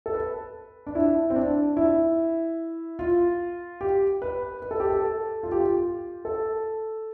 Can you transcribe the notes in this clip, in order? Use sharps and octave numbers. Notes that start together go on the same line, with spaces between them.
A4
B4
D4
E4
C4
D4
E4
F4
G4
B4
B4
A4
G4
A4
F4
G4
F4
A4